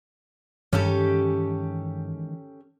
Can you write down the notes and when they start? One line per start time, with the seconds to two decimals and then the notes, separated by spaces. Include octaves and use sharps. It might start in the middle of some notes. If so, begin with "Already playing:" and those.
0.73 G2 D#3 E3 G#3 C#4 G4 A4